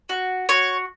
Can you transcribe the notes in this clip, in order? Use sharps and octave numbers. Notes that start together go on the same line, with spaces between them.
F#4
F#4 C#5